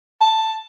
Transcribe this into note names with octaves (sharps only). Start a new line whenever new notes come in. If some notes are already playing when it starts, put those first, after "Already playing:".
A5